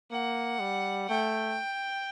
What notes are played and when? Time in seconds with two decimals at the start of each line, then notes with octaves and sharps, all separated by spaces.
0.11 A#3 F#5
0.60 G3
1.09 A3 G5